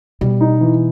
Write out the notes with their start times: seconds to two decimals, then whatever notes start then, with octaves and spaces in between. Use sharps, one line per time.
0.21 B2 G3
0.41 D#4
0.61 E3